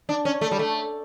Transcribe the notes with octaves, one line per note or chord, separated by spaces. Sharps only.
D4
C#4
A3
G3
A3